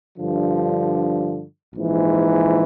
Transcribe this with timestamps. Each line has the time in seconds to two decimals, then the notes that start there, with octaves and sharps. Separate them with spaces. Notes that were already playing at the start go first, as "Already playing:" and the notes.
0.17 G2 D3 F3
1.75 A#1 G#2 E3